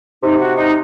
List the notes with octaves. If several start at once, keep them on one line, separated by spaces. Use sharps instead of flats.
C3 D#4
F#4
D#4